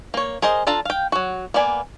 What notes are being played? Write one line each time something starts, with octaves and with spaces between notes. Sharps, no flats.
A#3 C#5
G#4 A#4 C5 D#5
D4 F4 A4 A5 A#5
F5 G5
F#3 F#4
A#3 B3 D5 G#5